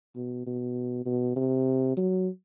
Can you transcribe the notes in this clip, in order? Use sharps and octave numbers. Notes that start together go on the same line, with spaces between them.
B2
B2
B2
C3
F#3